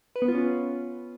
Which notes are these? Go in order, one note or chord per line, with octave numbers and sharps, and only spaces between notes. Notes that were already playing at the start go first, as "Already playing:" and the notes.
B4
B3
F4
C#4